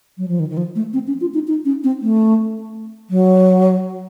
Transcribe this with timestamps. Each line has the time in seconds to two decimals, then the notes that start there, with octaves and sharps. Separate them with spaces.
0.18 F#3
0.28 F3
0.40 D#3
0.50 D#3
0.57 F3
0.75 A3
0.93 C4
1.07 C#4
1.21 F4
1.34 D#4
1.48 D#4
1.65 C#4
1.84 C4
2.02 A3
3.10 F#3